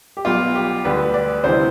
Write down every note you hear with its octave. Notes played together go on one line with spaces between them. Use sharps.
G4
B1 B2 G3 F4
G4
D2 D3 G3 B4
D5
D2 C3 E3 G3 C5